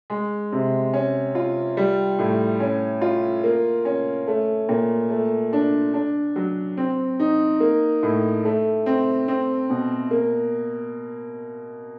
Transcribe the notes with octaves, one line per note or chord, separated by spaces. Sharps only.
G#3
C3
C#4
F4
G3
A2
C#4
F4
A#3
C#4
A3
A#2
A3
D4
D4
F#3
C4
D#4
A#3
A2
A3
C4
C4
B2
A#3